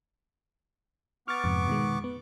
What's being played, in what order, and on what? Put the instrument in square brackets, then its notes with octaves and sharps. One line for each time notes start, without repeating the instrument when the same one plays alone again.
[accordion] B3 C#6 D6 [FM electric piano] F6 A6
[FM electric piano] F2 G#2 C3
B2 D#3 G#3
B3